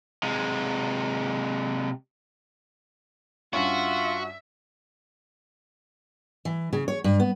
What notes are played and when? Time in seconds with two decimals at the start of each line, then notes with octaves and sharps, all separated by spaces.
0.23 C3 G#3
3.53 G2 C#4 F4 F#4 E5
6.45 E3
6.73 C#3
6.88 C#5
7.04 G2
7.20 B3